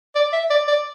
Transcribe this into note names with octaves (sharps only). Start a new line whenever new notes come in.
D5
E5
D5
D5